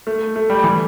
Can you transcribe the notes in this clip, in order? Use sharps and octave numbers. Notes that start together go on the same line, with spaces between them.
A3
A3
G3
E3